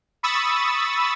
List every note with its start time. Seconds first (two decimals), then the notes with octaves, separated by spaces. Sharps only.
0.23 B5 C#6 D#6 E6 A6